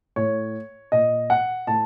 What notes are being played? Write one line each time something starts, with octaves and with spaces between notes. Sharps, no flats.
A2 C#5
A#2 D#5
F#5
A2 A5